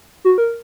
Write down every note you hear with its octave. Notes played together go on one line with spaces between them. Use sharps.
F#4
A#4